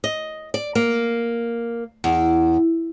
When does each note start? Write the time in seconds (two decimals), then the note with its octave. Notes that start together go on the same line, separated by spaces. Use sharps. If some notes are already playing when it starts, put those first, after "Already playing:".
0.04 D#5
0.54 D5
0.75 A#3
2.04 E2